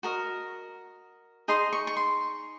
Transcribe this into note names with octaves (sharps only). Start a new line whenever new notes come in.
F#4 A#4 D#5
D#4 G#4 D#5 C6
C#6
C#6
C6